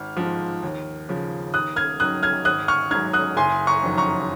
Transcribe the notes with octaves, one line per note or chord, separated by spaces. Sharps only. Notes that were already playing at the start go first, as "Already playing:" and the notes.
Already playing: G#1 F6
G#2 F3
D#2
C#3 F3
D#2 D#6 F#6
F6 G#6
D#3 F#3 D#6 F#6
F6 G#6
G#1 D#6 F#6
C#6 F6
G#2 F#3 F6 G#6
D#6 F#6
F#1 G#5 C6
A#5 C#6
F2 D#3 F#3
A#5 C#6